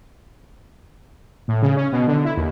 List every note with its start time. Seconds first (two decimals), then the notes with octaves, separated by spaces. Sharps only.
1.48 A2
1.62 C#3
1.76 C#4
1.92 B2
2.07 D3
2.25 E4
2.37 D#2